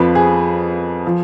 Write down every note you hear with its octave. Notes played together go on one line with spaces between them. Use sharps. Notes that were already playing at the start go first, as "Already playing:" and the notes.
Already playing: F2 F3 B4
G#4
F3